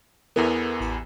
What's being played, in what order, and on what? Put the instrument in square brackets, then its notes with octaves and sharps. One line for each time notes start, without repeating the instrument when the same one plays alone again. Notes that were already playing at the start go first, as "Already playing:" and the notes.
[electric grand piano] E2 E3 B3 [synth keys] A4 A#4
[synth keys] A1 B5 E7